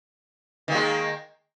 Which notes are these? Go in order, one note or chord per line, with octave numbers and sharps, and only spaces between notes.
D#3 G#3 A#3